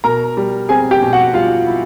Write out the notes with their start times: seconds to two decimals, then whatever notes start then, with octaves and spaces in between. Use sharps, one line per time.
0.04 B2 A#4 A#5
0.37 G3
0.69 C4 G#4 G#5
0.91 G4 G5
1.02 B2
1.13 F#4 F#5
1.34 G3 F4 F5
1.67 E4